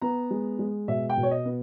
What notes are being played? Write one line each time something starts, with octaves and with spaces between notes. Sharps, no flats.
B3 A#5
G#3
G#3
B2 E5
G5
B2
C#5
D#5
B3